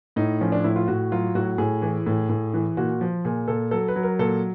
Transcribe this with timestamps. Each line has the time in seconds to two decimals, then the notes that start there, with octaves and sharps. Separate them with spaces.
0.16 A2 D#4
0.41 F3 C#4
0.52 D4
0.64 A2 E4
0.76 F4
0.88 A2 F#4
1.12 F#3 F4
1.35 A2 F#4
1.58 A2 G#4
1.82 E3
2.06 A2
2.29 A2
2.54 E3
2.77 A#2 F#4
3.01 F3
3.25 A#2 G#4
3.48 A#2 A4
3.71 F#3 A4
3.88 B4
3.96 F#3
4.03 A#4
4.19 A#2 A4